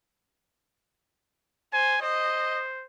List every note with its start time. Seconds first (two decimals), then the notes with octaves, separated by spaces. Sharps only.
1.73 C5 G#5
2.02 C5 D#5